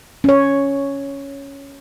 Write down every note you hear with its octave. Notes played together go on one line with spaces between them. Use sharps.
C#4 C#5